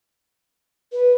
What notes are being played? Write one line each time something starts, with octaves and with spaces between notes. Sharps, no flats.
B4